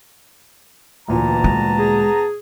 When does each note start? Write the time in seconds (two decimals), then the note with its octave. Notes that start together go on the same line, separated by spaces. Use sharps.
1.08 D2 A#2 E3 B3 A5 A#5
1.44 G#3
1.79 G#4